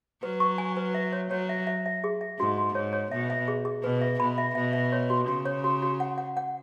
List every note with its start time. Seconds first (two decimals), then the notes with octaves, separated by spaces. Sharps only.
0.23 F#3 B4
0.40 C#6
0.58 G#5
0.77 B4
0.94 E5
1.12 C#5
1.31 F#3 C#5
1.49 E5
1.67 E5
1.86 E5
2.04 G#4
2.21 E5
2.39 G#2 F#4
2.58 F#4
2.75 G#2 C#5
2.93 C#5
3.11 B2 E5
3.30 E5
3.48 G#4
3.65 G#4
3.83 B2 B4
4.01 E5
4.20 B2 B5
4.38 E5
4.55 B2 E5
4.73 E5
4.92 C#5
5.10 F#4
5.28 C#3 F#4
5.46 C#5
5.64 F#4
5.82 F#4
6.00 F#5
6.18 F#5
6.37 F#5